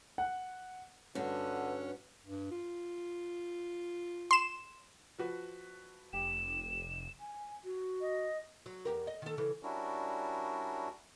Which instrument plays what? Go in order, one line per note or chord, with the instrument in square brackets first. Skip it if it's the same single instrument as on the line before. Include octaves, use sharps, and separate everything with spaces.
[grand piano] F#5
[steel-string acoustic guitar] G2 D4 F#4 [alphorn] D3 [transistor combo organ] C#4 [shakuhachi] B4
[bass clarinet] G2
F4
[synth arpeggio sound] C6 E7
[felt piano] F3 F#4 B4
[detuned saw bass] F1 [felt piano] G4 [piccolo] E7
[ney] G#5
F#4
[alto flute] D#5
[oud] F#3
E2 G4 A#4
D#5
D#3 A4
C#3 E3
[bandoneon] G3 C#4 D4 E4 F#4 A#4